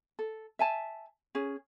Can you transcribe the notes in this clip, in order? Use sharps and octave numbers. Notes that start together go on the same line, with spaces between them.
A4
E5 G#5 A5
C#4 G#4